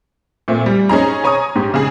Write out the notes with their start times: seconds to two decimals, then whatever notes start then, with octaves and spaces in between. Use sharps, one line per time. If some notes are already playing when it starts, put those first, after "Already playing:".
0.48 A#2 A3 C4
0.66 G3
0.89 C#4 D#4 G#4 A#5
1.24 C#5 G#5 A#5 C#6 D#6
1.55 G#2 G4
1.74 C#3 G#4